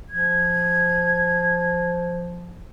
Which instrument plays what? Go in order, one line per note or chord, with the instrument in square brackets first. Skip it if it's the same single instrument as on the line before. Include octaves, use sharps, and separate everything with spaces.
[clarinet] F3 [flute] G#6